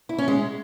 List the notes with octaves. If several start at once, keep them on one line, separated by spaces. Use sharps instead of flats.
E4
C#4
G#3